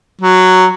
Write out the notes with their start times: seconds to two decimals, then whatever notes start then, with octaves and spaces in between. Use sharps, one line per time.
0.22 F#3